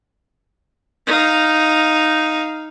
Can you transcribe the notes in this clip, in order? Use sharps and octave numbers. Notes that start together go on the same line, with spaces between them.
D#4 F5